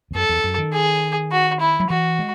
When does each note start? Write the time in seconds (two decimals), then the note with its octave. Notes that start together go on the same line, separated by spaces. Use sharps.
0.11 E2
0.15 F#2 A4
0.29 E2
0.44 F#2
0.58 D#3
0.73 G#4
1.31 F#4
1.60 E4
1.80 F#3
1.90 E3 F#4
2.19 G#3